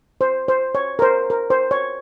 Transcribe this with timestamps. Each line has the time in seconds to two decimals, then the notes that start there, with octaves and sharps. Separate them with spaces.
0.21 C5
0.48 C5
0.75 C#5
0.99 A#4
1.02 C5
1.30 A#4
1.50 C5
1.71 C#5